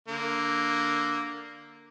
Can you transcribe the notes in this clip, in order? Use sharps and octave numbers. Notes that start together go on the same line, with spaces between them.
D3 A#3